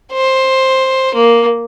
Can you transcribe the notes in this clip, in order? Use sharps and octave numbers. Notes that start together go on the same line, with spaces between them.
C5
A#3